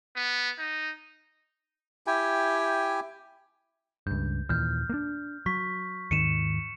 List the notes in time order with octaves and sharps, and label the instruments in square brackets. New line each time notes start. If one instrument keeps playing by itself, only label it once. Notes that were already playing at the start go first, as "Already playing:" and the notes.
[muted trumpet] B3
D#4
[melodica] E4 G4 G5 G#5
[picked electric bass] C#2 G2 [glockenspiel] G6
[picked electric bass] D#2 A#2 E3 [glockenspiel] F6 G6
[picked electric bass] A#3 D4
[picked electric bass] F#3 [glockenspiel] C#6 B6
[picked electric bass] D#2 G#2 D#3 [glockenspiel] C#7 D#7 E7